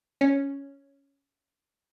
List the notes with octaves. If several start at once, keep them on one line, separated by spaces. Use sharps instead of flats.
C#4